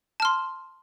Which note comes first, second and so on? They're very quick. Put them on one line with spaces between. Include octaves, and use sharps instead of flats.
A5 F6 C6